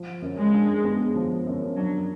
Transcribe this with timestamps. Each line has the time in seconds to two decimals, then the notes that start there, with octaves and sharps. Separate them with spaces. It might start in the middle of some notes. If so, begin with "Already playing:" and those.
Already playing: F3
0.22 F#2
0.38 G#3
0.53 D4
0.84 B3
1.16 F3
1.47 F#2
1.77 F#3 D4